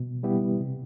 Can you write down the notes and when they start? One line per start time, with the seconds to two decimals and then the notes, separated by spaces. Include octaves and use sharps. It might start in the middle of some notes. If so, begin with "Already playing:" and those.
Already playing: B2
0.23 G3 B3 E4 G4
0.60 C3